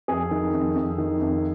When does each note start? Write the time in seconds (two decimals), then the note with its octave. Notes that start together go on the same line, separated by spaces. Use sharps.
0.08 F2 G#4
0.31 D#3
0.53 F2
0.75 F2
0.98 D#3
1.21 F2